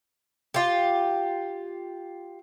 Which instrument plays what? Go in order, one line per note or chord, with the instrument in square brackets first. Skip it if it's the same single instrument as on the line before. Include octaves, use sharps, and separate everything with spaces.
[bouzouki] F4 G4